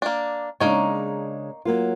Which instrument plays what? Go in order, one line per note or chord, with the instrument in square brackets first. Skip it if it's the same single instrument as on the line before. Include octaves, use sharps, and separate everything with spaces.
[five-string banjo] A#3 D4
[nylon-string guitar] C#3 G#3 D4 [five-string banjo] A#3 D#4 C#5
[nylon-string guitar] F#3 A#3 F4